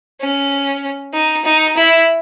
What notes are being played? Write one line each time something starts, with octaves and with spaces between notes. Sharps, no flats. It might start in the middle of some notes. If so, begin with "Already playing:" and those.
C#4
D#4
D#4
E4